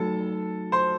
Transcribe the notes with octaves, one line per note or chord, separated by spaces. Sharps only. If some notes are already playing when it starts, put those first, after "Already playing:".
Already playing: F#3 A3 D#4 F#4 A4 A5
C5 C6